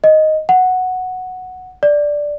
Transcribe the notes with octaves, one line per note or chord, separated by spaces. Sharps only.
D#5
F#5
D5